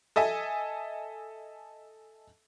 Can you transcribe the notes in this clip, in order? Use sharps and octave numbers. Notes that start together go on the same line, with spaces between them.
A4 D#5 E5 G#5